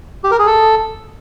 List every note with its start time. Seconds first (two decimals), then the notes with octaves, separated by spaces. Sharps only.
0.24 G4
0.31 A#4
0.39 G#4
0.47 A4